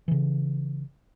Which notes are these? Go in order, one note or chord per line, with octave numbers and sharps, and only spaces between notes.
C#3 E3